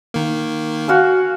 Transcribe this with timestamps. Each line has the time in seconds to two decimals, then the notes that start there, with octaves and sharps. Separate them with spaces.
0.14 D#3 A#3
0.88 F#4 F5 G#5